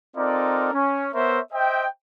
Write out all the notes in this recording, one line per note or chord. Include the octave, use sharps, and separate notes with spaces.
C4 D#4 F4 A4 A#4 D5
C#4
B3 A#4 C5 C#5 E5
C5 D#5 E5 G5